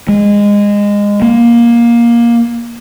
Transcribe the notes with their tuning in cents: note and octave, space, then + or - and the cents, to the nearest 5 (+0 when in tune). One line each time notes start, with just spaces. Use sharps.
G#3 -20
A#3 +15